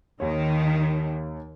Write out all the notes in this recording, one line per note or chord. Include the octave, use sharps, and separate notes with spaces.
D#2 D#3 C#5